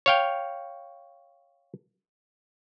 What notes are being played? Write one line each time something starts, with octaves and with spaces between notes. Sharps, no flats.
C#5 F5 G5